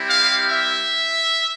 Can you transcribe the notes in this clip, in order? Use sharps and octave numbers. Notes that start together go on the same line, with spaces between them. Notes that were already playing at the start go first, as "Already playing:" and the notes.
Already playing: G3 C4 E4 G4
F5
E5